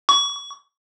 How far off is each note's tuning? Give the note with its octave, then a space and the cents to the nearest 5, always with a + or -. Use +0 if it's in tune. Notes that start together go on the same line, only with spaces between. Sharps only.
C#6 +30